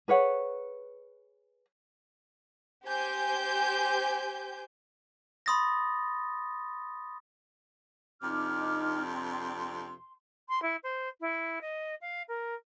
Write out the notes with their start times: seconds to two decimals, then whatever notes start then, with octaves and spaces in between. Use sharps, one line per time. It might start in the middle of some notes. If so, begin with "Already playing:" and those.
0.08 G#4 B4 C#5 F#5
2.86 G4 C5 G#5 G6
5.46 B5 C6 D#6 A6 A#6
8.21 F2 C3 D4 D#4 D6 F6
9.12 C6
10.49 C6
10.62 E4
10.83 C5
11.20 E4
11.61 D#5
12.01 F5
12.28 A#4